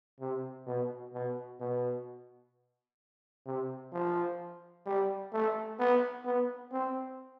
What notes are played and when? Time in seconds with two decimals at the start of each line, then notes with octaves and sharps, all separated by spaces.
0.20 C3
0.67 B2
1.14 B2
1.60 B2
3.46 C3
3.93 F3
4.86 G3
5.33 A3
5.79 B3
6.25 B3
6.72 C4